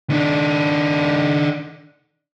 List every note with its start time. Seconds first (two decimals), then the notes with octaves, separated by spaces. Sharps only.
0.10 D#3 D4